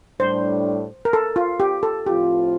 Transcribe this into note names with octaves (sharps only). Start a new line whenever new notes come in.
A2 G3 D4 C5
A#4
A4
F4
G4
A4
A2 F3 C4 F4 G4